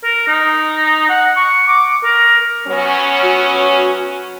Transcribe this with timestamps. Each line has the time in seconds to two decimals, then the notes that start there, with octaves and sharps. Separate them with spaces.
0.03 A#4
0.27 D#4
1.09 F#5
1.36 C#6
1.67 D6
2.04 A#4
2.66 F#3 B3 C#4
3.23 F#4